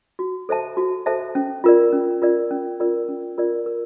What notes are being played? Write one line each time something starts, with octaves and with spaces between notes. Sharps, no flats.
F#4
A4 C5 E5 A5
F#4
A4 C5 E5 A5
C#4
F4 A#4 D5
C#4
F4 A#4 D5
C#4
F4 A#4 D5
C#4
F4 A#4 D5
A#4